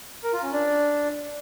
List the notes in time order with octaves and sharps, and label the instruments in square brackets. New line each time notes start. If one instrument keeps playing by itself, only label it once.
[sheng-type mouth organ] A#4
F4
C#4
D4